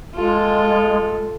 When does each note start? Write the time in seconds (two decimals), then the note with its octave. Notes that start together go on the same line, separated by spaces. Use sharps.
0.14 G#3 F4 A4